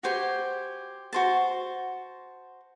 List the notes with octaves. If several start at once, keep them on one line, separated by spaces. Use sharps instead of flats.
F#4 G4 C5 G#5
F#4 C5 A5